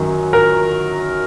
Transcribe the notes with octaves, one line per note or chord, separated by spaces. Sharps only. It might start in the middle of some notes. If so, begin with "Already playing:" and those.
Already playing: F#2 D#3 F#3
A#4